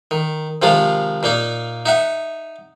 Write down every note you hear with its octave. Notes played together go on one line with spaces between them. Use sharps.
D#3
C3 D#3 F3 G#3 F4
A#2 A#3 D#4
D#4 E5 F#5